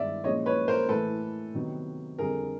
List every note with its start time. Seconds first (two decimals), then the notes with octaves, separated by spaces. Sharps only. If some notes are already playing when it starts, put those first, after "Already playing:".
Already playing: G2 D#3 G#3 B3 D5 E5
0.24 A#2 F3 G#3 C#4 C#5 D#5
0.46 B4 C#5
0.68 A#4 C5
0.89 A2 E3 A3 A4 B4
1.54 C3 D#3 F#3 B3
2.18 F2 D3 G3 G#4 A#4